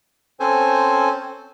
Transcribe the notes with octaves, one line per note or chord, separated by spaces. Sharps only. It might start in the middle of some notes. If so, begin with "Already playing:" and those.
C4 C#4 A4 C5 G#5